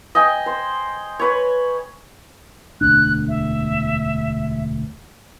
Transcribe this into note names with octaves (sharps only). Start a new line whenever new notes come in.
D#5 G5 G#5
C5
B4 C#5
E1 D2 D4 F#6
E5